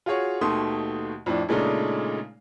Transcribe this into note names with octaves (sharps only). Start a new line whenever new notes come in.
F4 F#4 G#4 C#5
D#2 B2 D#3 A3 C6 D#6
F2 A2 D4
A#2 C#3 G#3 A3 D4 D#4